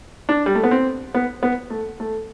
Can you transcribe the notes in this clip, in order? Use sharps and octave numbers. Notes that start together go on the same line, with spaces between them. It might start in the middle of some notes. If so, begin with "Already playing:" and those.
D4
G3
A3
B3
C4
B3
B3
A3
A3